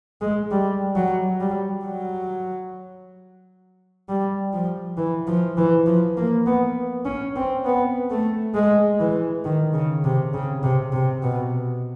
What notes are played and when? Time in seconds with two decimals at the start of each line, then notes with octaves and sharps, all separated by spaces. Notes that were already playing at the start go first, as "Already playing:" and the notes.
0.22 G#3
0.51 G3
0.96 F#3
1.40 G3
1.85 F#3
4.09 G3
4.53 F3
4.98 E3
5.27 F3
5.57 E3
5.87 F3
6.17 A#3
6.46 B3
7.06 C#4
7.36 C4
7.65 B3
8.10 A3
8.55 G#3
8.99 E3
9.44 D#3
9.73 C#3
10.04 C3
10.34 C#3
10.63 C3
10.93 C3
11.23 B2